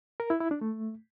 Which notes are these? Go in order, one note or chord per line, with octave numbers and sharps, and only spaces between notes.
A#4
E4
E4
D4
A3